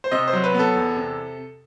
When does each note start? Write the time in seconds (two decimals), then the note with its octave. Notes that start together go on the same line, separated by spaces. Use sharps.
0.04 C5
0.11 C3 D#5
0.27 C5
0.33 F#3
0.44 B4
0.54 B3
0.59 A4
0.75 E2
0.96 C3